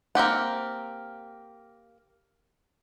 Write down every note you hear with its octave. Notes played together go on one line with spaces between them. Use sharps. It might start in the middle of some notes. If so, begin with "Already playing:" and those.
A#3 C4 G4 F#5